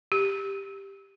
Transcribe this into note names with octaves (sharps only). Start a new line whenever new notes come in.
G4